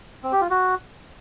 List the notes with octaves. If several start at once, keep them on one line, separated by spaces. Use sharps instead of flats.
C4
G4
F4
F#4